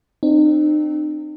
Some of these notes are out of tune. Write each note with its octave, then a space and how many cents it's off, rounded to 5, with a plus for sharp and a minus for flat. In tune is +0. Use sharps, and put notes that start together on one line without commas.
C4 +0 D#4 -40